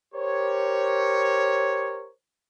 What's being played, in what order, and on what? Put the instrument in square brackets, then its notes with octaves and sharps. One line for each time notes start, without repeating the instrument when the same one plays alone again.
[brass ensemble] G4 A#4 C5 C#5